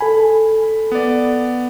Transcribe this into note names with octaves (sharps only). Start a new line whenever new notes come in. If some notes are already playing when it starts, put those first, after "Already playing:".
A4 G#5 B5
B3 D5